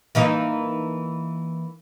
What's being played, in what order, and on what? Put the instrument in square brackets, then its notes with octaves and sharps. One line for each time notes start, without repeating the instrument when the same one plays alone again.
[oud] E3 A#3 D#4